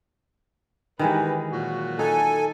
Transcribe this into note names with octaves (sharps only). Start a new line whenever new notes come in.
D#3 E3 G#3 D#4 G4 B4
A#2 F#3 F#4
D#4 A4 G#5